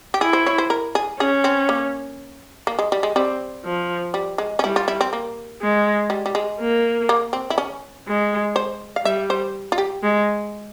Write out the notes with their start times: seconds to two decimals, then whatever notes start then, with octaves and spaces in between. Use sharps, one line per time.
0.14 G4
0.21 E4 G#4
0.33 C5
0.46 C#5
0.58 C5
0.70 A#4
0.95 G#4
1.19 C#4 G#4
1.44 C4
1.69 A#3
2.67 A#3
2.79 G#3
2.92 G3
3.03 G#3
3.15 G3 C4
3.65 F3
4.14 G3
4.38 G#3
4.59 C#4
4.63 G3 E4
4.76 F4
4.88 E4
5.01 C4
5.13 A#3
5.62 G#3
6.10 G3
6.26 G3
6.35 G#3
6.60 A#3
7.09 A#3
7.33 C4
7.50 E4
7.58 C#4
8.07 G#3
8.56 C5
8.96 F5
9.04 G3 E5
9.30 C5
9.72 F4
9.78 G4
10.03 G#3